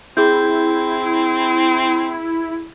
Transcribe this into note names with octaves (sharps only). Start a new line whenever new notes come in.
C4 E4 G#4 G6